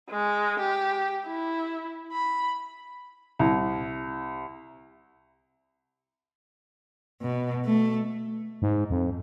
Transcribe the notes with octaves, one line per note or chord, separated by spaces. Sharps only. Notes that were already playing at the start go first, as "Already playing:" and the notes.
G#3
G4
E4
B5
C2
B2
A3
G#2
F2